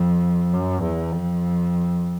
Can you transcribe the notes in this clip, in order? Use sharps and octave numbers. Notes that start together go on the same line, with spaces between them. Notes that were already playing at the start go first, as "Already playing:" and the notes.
Already playing: F2
F#2
E2
F2